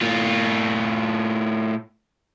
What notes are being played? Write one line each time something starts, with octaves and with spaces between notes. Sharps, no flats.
A2 F4